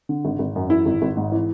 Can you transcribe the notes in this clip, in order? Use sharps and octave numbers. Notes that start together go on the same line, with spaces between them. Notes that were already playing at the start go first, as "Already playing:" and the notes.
D3
G#1
G#1
F#2
E3 E4
G#1
G#1
G#2
E3